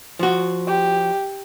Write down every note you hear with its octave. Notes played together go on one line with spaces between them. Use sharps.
F3 F#4
G4